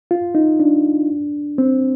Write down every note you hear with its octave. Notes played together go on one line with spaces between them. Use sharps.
F4
D#4
D4
C4